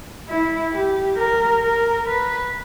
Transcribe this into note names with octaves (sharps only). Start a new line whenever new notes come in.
E4
G4
A#4
A#4
B4